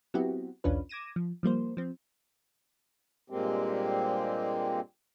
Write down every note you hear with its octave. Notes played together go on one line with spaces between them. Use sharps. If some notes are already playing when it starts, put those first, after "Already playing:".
F#3 B3 C4 E4 F#4 G4
B1 E2 C#4 D4 F4 B4
D6 G#6 A#6 D#7 E7
F3
F3 G3 A#3 C5
F3 C4
G2 A#2 G#3 A#3 C4 G4